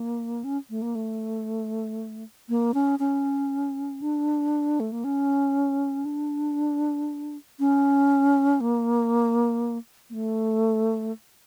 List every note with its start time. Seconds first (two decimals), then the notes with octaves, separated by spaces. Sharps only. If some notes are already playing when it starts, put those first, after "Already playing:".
Already playing: A#3
0.44 C#4
0.70 A3
0.82 A#3
0.95 A3
2.49 A#3
2.74 C#4
2.99 C#4
4.02 D4
4.80 A3
4.92 A#3
5.04 C#4
6.05 D4
7.60 C#4
8.61 A#3
10.10 A#3
10.14 A3